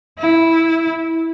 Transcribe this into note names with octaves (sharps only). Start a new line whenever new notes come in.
E4